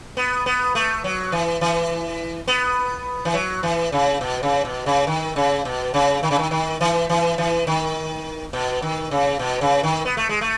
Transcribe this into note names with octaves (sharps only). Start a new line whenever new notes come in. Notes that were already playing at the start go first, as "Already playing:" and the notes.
B3
B3
A3
F#3
E3
E3
B3
E3
F#3
E3
C#3
B2
C#3
B2
C#3
D#3
C#3
B2
C#3
D#3
C#3
D#3
D#3
E3
E3
E3
D#3
B2
D#3
C#3
B2
C#3
D#3
B3
A3
G#3
A3